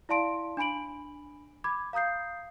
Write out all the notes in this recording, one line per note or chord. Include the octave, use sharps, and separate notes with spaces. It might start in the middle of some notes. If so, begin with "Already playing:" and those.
E4 D5 F5 A5 C6 D7
D4 G#5 B5 D7 F#7
B5 D6 G#6
F5 A#5 D#6 G6 C7